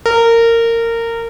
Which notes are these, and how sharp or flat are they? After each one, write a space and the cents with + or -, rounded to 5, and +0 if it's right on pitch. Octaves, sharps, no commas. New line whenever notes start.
A#4 -20